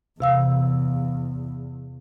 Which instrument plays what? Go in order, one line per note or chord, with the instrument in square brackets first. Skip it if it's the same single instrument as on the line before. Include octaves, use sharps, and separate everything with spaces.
[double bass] E2 [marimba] C3 F5 E6